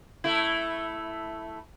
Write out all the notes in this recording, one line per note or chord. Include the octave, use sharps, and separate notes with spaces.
A3 E4